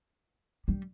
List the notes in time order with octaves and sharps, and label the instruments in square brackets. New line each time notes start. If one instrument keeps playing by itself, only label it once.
[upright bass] G3